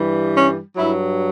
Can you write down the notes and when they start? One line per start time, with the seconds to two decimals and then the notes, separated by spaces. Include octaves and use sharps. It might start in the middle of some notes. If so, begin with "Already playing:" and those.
Already playing: G2 E3 G3
0.33 C#4
0.77 G2 F#3 E4